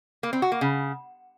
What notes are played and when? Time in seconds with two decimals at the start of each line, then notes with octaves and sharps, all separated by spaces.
0.23 A#3
0.33 C4
0.42 F#4
0.52 A#3
0.61 C#3